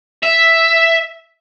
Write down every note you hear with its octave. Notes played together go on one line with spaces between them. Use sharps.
E5